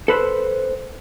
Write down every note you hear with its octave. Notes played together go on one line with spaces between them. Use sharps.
A4 B4 C5